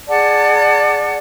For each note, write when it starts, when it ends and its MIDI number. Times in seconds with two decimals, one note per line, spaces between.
0.08 1.18 68
0.08 1.18 74
0.08 1.18 78
0.08 1.18 81